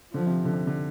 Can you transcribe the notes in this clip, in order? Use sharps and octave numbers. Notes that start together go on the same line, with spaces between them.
D3 F3
C3
D3
C3
D3